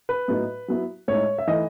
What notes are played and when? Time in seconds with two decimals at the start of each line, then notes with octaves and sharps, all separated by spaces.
0.09 B4
0.28 A2 F#3 B3 D#4
0.68 F#3 B3 E4
1.08 A2 G#3 D#4 C#5
1.38 E5
1.47 E3 A3 D#4 D#5